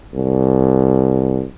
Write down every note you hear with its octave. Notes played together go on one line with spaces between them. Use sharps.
C2